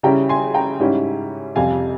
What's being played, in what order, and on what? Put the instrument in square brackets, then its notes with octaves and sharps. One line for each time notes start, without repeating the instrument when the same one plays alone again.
[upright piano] C#3 G3 C#4 E4 G5 A#5
G#5 C6
G5 A#5
G#2 G3 C#4 E4
F2 C3 G3 C4 F5 G#5